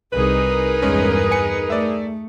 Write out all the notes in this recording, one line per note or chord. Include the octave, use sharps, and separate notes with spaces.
C2 D#4 G#4 A#4 B4
E2 G2 G#3 C#4
G#5 C#7
A3 D5 E5